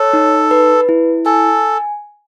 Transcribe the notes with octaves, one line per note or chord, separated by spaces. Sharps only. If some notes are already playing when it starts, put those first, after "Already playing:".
Already playing: A4 C#5
D#4
B4
E4
A4 G#5